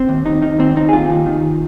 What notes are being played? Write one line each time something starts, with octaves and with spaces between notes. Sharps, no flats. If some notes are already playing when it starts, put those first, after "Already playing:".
Already playing: C4
D#2
D#2 D#4
D#3 D#4
D#2 C4
D#2 D#4
G#4
D#2 F4
D#2
D#3